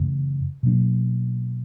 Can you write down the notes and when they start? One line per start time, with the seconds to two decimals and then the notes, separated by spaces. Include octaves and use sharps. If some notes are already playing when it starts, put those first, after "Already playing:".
Already playing: F#2 C#3 E3 A3
0.63 B2 F#3 A#3 D4